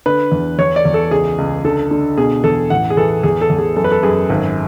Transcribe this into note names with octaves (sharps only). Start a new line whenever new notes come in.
D3 B4
E2
E2 C#5
D5
E2
A4
C#2 G#4
C#2
D3 A4
D3
B2 G#4
E2 A4
A1 F#5
G#4
E3 A4
E2 G#4
A4
E2
G#4
F#2 A4
B4
A4
F#2 G#4
G#1